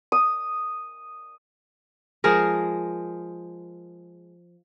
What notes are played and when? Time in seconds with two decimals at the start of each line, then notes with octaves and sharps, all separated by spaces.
0.12 D#6
2.24 F3 G#3 G#4 A#4